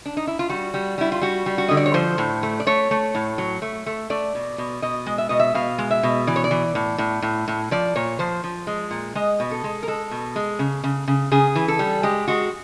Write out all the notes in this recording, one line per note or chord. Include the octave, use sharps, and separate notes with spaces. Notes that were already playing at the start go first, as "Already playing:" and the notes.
D4
D#4
E4
F4
G3 F#4
G3
G3 E4
F4
G3 F#4
G3
F#4
D3 D#5
D5
C#5
F3 C5
A2
A3
D5
A3 C#5
A3
A2
F#3
A3
A3
A3 D5
B2
B2
B2 D#5
G#3
E5
B2 D#5
E5
B2 F5
G#3
E5
B2
E3 D5
C#5
D5
E3
A2
A2
A2
A2
F3 D5
A#2 C#5
F3 C5
F3
G#3
A#2
G#3 D#5
B2
A4
G#3
A#4
G#3 A4
B2
G#3
C#3
C#3
C#3
C#3 G#4
E3
A4
G3
G#3 G4
G#3 F#4